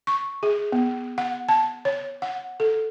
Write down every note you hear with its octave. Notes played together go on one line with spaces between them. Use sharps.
C#6
G#4
B3
F#5
A5
C#5
F#5
A4